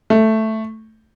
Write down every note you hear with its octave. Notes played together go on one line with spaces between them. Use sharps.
A3